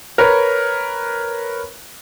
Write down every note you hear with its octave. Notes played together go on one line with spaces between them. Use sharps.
A#4 B4 C#5